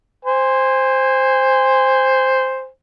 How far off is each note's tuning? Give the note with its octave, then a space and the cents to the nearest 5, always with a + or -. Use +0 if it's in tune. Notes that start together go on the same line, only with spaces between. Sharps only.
C5 +0 G#5 -30